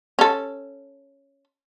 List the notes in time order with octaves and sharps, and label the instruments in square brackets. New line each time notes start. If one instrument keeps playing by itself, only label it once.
[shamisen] C#4 A4